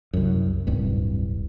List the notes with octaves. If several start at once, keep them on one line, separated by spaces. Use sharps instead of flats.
C2 F#2
D1 C2 G2